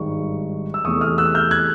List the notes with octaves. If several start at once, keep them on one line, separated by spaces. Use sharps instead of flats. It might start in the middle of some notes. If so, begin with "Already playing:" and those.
Already playing: G#1 G2 D#3 G#3 C#6
E6
E2 C3 E3 A3 C#6 D#6
D#6 F6
E6 F#6
F6 G6
F#6 G#6